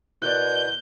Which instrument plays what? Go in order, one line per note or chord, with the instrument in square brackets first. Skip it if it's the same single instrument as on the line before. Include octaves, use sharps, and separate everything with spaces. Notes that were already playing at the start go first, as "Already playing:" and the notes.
[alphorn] B2 [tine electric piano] E4 A#4 D5 [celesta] F#6 [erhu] G6